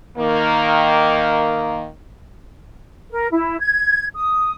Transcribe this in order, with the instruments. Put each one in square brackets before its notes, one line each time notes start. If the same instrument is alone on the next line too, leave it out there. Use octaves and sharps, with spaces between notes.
[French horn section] D#3 A#3
[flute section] A#4
E4
G#6
D#6